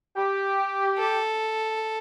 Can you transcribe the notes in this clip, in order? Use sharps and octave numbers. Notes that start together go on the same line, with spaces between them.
G4
A4